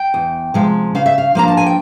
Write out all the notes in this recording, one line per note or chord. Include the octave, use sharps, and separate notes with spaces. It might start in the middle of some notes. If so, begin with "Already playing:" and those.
Already playing: G5
E2
C3 F3 G#3
C#3 F5
E5
F5
F3 A#3 D4 A#5
A5
G#5
G5